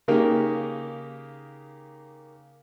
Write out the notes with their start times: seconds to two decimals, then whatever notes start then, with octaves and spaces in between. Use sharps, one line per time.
0.08 C#3 A#3 D#4 G4 A#4